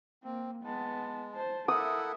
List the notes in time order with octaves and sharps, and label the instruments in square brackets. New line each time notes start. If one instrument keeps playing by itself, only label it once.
[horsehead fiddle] A#3 [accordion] C4
[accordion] G#3 [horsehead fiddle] B3 A5
[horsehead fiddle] C5 A5
[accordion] E4 A4 F#5 [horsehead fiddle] A#4 E5 [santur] D#6